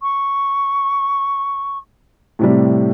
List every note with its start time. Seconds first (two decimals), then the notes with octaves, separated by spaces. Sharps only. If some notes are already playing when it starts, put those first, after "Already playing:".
0.02 C#6
2.39 A2 C3 G3